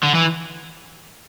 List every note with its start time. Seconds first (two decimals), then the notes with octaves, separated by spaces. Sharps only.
0.04 D3
0.15 E3